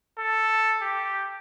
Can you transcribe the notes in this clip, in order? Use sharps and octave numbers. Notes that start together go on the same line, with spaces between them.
A4
G4